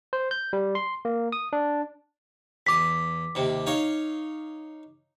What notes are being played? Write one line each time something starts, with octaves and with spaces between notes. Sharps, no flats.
C5
G6
G3
C6
A#3
D#6
D4
E2 D6 D#6 B6
D#2 C3
D#4 C#5 F5